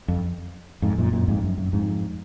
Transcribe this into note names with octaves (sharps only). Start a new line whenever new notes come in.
F2
F2 G#2
F#2 A#2
F#2 A#2
F2 G#2
F#2
F#2
F2 G#2